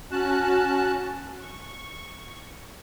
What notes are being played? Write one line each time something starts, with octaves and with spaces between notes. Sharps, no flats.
C#4 F#4 A5 F#6
C#6